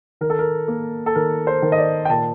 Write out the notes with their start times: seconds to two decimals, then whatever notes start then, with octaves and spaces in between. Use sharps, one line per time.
0.21 D#3 A#4
0.30 A4
0.39 A#4
0.68 A#3
1.06 A4
1.15 D#3 A#4
1.47 C5
1.62 D#3
1.72 D#5
1.78 D5
2.05 G5
2.09 A#2 A5